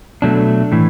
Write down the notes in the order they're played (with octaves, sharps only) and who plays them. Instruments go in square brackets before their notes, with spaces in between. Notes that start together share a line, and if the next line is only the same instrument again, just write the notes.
[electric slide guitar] B2 F#3 A3 D4
A2 E3